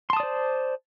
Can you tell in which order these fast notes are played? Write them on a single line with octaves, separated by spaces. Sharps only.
C6 A5 D#6 D5 C5